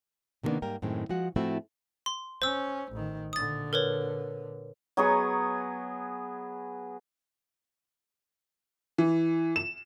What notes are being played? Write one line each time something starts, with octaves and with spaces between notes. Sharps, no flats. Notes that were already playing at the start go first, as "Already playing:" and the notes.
C3 D#3 G3 A#3 B3 D4
G#2 G3 A#3 A#4 G5
F#2 A2 D#3 G#3 C4
F3 G#3 F#4 F#5
A2 F3 A3 C4 E4 F#4
C6
C#4 C5 E6
A1 D#3
A#2 D3 D#6 A6
A#4 B4 C#5
F#3 B3 G#4 C#6
E3
E7